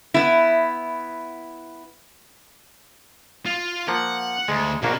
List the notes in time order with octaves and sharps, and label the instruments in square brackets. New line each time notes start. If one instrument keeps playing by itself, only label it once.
[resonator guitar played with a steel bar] B3 E4
[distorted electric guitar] F4
[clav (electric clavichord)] F3 A#3 [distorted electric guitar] F#5
[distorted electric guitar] D2 [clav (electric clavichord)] G#3
[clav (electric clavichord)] A#1 A#3 F#4 [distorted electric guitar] B2